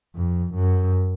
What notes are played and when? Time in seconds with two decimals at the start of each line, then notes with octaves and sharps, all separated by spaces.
0.16 F2
0.55 F#2